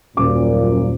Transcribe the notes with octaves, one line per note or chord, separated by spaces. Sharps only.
D#1 F#2 A#2 D6